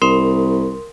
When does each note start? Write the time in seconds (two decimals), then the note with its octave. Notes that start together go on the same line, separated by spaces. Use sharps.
0.02 C2 A#4 C6